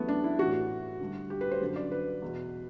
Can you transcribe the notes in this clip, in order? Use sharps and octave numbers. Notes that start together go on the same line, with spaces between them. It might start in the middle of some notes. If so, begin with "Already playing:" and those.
Already playing: F#2 E3 A3 B3
D4
E4
A2 E3 F#4
G2 D3
G4
B4
C5
F#2 D3
D5
B4
E2 B2